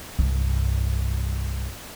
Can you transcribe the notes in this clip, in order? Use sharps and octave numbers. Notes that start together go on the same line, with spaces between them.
C2 G2